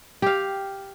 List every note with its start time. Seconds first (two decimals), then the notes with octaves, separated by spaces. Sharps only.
0.22 G4 F5